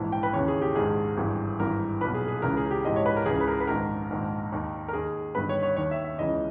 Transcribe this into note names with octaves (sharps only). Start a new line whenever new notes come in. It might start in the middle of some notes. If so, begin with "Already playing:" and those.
Already playing: A#1 G#2 E3
G5
B4
D#2 C#3 E3 C#5
G#4
G4
A#1 G#2 D#3 G#4
G#1 G2 E3
G#1 G2 E3 A#4
B1 A#2 B4
G#4
G#4
C#2 C#3 E3 A#4
G#4
G4
A#1 G#2 E3 D#5
C#5
B4
A#4
C#2 C#3 E3 G#4
B4
A#4
B4
A#1 G#2 D#3 A#4
A#1 G#2 D#3
D#2 D#3
A#4
D#2 D#3 G#4
G1 G2 D#3 B4
C#5
C#5
D#2 D#3 C#5
E5
E5
C#2 C#3 E3 D#5